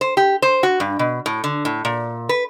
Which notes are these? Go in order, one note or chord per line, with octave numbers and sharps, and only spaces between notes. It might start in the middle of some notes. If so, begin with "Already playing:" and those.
C5
G4
C5
F#4
G2
B2
A2
D3
A2
A#2
B4